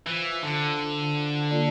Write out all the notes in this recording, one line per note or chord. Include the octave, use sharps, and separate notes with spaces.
E3 F4 C5 F5
D3
A#3 F4 A4 D5